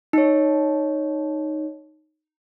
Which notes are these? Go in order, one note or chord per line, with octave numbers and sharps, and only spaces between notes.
D#4 C#5